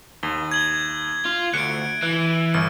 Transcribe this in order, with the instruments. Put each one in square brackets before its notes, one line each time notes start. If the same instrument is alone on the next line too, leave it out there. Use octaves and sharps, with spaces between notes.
[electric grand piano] D#2 [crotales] G7
[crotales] G#6 F#7 G7
[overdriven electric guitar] F4
[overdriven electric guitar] D2 [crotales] F#6 D7 [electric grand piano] C#7
[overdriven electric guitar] E3 [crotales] F#6
[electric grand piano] G1 [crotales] F6